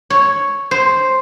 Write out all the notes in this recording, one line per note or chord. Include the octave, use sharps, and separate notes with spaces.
C#5
C5